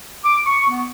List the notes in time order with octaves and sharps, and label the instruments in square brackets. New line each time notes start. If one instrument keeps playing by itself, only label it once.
[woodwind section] D6
C#6
B3